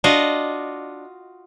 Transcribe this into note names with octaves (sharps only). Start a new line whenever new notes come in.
D4 F4 F#4 D#5